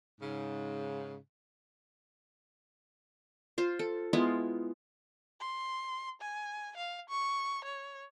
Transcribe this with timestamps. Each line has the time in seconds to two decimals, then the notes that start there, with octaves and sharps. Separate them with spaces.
0.20 G#2 C#3
3.58 F4 C5
3.79 A4
4.13 G#3 B3 E4 F4
5.40 C6
6.21 G#5
6.77 F5
7.09 C#6
7.65 C#5